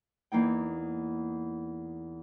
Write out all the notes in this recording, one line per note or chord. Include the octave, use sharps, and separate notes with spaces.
E2 A#3 D#4 G5